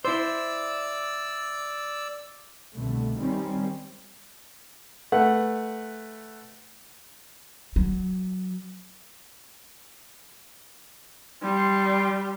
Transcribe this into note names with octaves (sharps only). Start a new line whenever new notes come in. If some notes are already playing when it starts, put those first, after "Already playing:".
E4 C5 D5 E6
C2 B2 D3 A3
D#3 G3 C4 C#4
A3 B4 F#5
F#3
G3 C6